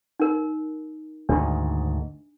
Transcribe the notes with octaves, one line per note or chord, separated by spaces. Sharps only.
D#4 A#4
D2 G#2 D#3 D4